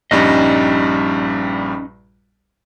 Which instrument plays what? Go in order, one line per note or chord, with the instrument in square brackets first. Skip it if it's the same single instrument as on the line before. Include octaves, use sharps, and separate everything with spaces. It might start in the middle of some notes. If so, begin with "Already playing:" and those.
[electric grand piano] A#1 G2 G3 [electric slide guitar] C#4 D#4 D#5